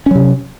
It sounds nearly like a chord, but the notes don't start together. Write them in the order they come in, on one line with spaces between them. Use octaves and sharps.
C#4 F#3 C3